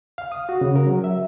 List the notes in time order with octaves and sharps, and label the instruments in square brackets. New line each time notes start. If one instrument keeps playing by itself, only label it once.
[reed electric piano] F5
D#6
F#4
C#3
A#4
F#3
E5